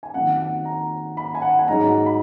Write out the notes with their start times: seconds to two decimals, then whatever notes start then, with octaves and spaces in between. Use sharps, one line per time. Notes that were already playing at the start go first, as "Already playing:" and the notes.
0.03 G#5
0.14 F2 D#3 F#3 F#5
0.40 F#5
0.65 A#5
1.17 B5
1.35 G#5
1.42 F#5
1.59 G#5
1.68 G#2 F#3 A#5
2.06 B5